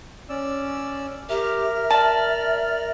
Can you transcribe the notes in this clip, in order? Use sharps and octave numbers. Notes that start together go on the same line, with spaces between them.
C#4 D5 E6
G4 A#4 E5 F6
D5 A5